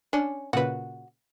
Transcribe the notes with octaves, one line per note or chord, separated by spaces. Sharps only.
C#4 D4
A#2 C#3 F#4 B4